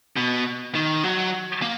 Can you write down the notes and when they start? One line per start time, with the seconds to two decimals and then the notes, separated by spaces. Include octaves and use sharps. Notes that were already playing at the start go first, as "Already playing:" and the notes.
0.16 B2
0.75 D#3
1.04 F#3
1.62 A#3